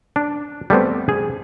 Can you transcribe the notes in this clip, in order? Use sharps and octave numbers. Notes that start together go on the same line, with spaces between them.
D4
G3 A3 B3 C4
G#4